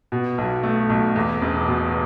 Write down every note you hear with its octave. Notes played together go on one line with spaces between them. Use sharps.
B2
B1
A3
B1
E2
E1
B2